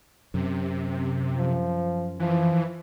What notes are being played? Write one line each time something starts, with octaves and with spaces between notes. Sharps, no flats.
F#2 C3
F3
E3 F3